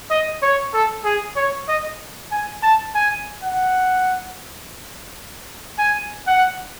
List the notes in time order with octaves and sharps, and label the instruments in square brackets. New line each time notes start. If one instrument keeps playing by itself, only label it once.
[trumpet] D#5
C#5
A4
G#4
C#5
D#5
G#5
A5
G#5
F#5
G#5
F#5